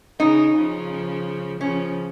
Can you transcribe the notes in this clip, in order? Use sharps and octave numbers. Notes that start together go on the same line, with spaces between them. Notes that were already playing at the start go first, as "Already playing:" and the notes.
C#3 D#4
C#3 F3
C#3 F3 C#4